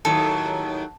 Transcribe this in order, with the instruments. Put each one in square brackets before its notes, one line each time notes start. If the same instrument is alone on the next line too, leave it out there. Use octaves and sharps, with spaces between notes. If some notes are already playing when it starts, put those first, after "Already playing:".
[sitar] D#2 A2 F#3 [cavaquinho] A4